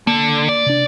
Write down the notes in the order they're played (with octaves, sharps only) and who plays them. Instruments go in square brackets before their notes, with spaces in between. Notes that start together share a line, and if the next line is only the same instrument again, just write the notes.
[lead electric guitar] D3 [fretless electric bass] A#3
[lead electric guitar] D5
[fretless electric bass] C3 D4